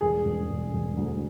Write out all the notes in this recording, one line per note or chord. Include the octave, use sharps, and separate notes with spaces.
E1 G#4
E1
E1
E1
D2